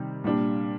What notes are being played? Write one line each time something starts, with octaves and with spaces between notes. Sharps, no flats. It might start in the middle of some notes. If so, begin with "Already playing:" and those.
Already playing: C3 D#3 G3
A#2 G3 D4